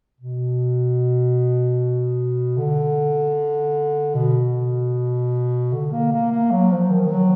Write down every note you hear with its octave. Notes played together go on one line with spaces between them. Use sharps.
B2
D3
B2
D3
A#3
A#3
A#3
F#3
F3
D#3
F#3